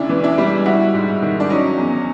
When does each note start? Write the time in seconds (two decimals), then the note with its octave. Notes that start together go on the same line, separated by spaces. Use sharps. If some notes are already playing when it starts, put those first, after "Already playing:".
Already playing: D2 C#3 D4 E4
0.09 E3
0.23 D4 E4
0.38 G3
0.65 G3 E4 F#4
0.94 G#2
1.22 D#3
1.40 D4
1.50 F#3 C#4 D#4
1.78 E2